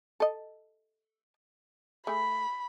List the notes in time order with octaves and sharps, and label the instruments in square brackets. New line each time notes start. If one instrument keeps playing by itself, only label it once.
[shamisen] A4 D#5
[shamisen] A3 G#4 [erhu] B5